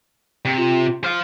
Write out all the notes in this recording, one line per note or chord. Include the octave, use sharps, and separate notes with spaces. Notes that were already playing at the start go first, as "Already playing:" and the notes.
C3
F4
C5 F5 F6